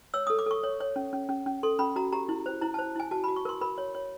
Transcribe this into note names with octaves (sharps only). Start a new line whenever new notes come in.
C#5 E6
A4 D#6
D6
A4 C#6
C#5
C#5
C#4
C#4
C#4
C#4
A4 C6
C#4 B5
F#4 A#5
G4 A#5
E4
C5
E4 A#5
C5 A5
E4 G#5
F#4 A5
F#4 B5
C#6
A#4 C6
A#4 B5
C#5
C#5